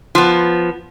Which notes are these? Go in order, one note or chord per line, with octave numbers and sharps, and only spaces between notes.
F3 B3